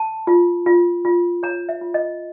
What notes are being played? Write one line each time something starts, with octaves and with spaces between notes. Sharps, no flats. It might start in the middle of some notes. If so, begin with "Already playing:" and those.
Already playing: A5
F4
F4
F4
C#5 A#5
E5
F4
D#5